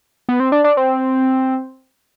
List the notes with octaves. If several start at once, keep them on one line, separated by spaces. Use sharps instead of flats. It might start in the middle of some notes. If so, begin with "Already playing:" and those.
B3
C4
D4
D4
C4